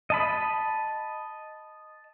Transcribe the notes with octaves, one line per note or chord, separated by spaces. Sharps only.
D#5 A5 B5